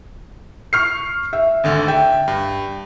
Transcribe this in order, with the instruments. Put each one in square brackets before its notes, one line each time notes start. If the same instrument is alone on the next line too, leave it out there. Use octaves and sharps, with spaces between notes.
[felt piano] C#6 F6 C7
E5
[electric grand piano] G#1 D2 D3
[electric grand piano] E5 [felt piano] G5
[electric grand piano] G2